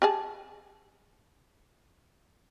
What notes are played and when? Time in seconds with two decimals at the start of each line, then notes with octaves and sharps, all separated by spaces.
0.02 G4 G#4 A5